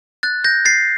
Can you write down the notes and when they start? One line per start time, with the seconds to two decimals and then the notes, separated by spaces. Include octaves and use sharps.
0.23 F#6 A6
0.44 G6 A#6
0.65 A6 C7